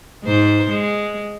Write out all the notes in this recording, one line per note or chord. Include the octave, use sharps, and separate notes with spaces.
G#2 C5
G#3